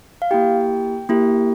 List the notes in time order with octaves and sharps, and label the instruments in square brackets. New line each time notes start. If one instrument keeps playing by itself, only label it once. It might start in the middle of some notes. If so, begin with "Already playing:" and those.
[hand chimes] F5
A#3 E4 G4 G5
A#3 E4 G4